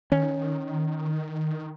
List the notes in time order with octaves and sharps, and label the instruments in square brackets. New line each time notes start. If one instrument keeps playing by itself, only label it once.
[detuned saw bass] D#3 [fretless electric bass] C#4